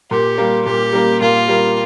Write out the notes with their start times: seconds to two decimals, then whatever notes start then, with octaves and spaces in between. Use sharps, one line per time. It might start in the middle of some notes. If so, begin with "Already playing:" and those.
0.10 A#2 G4
0.38 G3 A#3
0.65 A#2 G4
0.93 G3 A#3
1.21 A#2 F4
1.48 G3 A#3